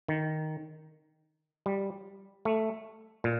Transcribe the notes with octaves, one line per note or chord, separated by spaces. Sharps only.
D#3
G3
A3
A#2